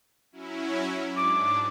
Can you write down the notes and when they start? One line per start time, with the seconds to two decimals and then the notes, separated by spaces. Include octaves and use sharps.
0.32 F#3 C#4 E4
1.16 G#2 D4 D6